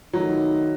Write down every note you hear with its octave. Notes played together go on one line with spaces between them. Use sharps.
D#3 F#3 A3 D#4